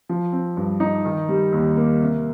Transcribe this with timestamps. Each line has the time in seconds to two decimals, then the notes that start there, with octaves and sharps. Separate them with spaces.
0.09 F3
0.32 C4
0.57 G2
0.80 D#4
1.05 D#3
1.29 G3
1.52 D#2
1.77 A#3
2.01 C3